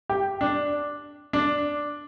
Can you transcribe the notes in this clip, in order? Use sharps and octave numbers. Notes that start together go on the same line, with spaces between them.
G4
D4
D4